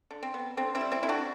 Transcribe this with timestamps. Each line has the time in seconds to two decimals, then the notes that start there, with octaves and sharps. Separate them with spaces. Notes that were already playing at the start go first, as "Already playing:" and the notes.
0.11 D3
0.23 C4
0.34 B3
0.57 D3 C4
0.75 C4 E4
0.81 G3
0.92 C4 E4
1.03 D3 E4
1.09 D4 F#4